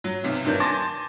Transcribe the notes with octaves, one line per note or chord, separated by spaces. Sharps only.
F#3
B1 C3
G1 D#3 F#3 A#3 D4 G6
G#5 A5 C6 D6 A6 A#6